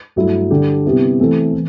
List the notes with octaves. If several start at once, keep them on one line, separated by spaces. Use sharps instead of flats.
G2 F#3 A3 E4
D3 G3 D4 G4
C3 G3 B3 E4 G4
E3 A3 C4 E4
E3